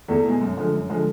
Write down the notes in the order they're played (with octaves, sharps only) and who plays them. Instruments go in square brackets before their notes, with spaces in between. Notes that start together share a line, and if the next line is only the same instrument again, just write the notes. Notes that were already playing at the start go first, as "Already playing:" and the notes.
[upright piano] E2 A3 A4
B2 G#3
F#2
D3 F3 G#3
F#2
D3 F3 G#3